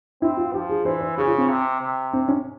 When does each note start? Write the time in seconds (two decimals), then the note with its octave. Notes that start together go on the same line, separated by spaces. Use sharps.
0.22 C4 E4
0.37 F4
0.53 F3 G4
0.69 G#4
0.85 E3 C5
1.01 C5
1.17 C#3 G#4
1.27 F4
1.38 C4
1.49 C3
1.81 C3
2.13 C4
2.28 C#4